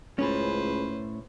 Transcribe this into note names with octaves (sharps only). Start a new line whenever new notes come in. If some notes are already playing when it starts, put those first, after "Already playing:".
C#2 A2 C#4 B4 C5